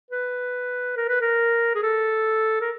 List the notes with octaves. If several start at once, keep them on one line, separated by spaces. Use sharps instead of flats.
B4
A#4
B4
A#4
G#4
A4
A#4